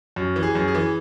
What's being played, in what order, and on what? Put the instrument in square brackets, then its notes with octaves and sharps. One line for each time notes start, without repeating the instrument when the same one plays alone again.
[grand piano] F#2
E3
G#4
F#2
G#4
E3